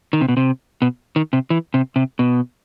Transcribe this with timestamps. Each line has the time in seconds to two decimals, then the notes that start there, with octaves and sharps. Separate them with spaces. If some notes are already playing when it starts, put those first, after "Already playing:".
0.13 D#3
0.21 C3
0.28 B2
0.37 C3
0.82 B2
1.16 D#3
1.33 C3
1.50 E3
1.74 C3
1.96 C3
2.19 B2